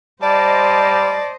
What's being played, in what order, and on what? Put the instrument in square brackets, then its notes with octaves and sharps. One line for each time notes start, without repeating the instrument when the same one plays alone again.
[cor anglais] G3 [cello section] C5 D#5 [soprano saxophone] D5 [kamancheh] A5